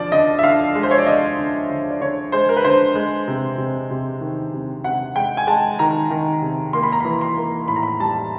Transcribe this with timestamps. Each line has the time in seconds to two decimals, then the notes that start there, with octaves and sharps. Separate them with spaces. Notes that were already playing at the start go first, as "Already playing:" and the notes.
Already playing: D3 F3 D5
0.12 D3 D#5
0.39 E5
0.43 D3 F5
0.75 G#3
0.83 C5
0.91 C#5
0.98 D5
1.06 D3 D#5
1.38 D3
1.70 D3
1.90 D5
2.01 D3 C#5
2.32 G#3 C5
2.49 A#4
2.57 B4
2.64 D3 C5
2.95 G#3
3.28 C3
3.58 C3
3.91 C3
4.21 D#3
4.54 C3
4.84 C3 F#5
5.16 G#3 G5
5.37 G#5
5.47 G#3 A5
5.79 D#3 A#5
6.10 D#3
6.42 C3
6.73 A#3 C6
6.83 B5
6.92 A#5
7.00 E3 B5
7.21 C6
7.37 A#3
7.68 A2 B5
7.76 A#5
7.83 B5
8.00 G3 A5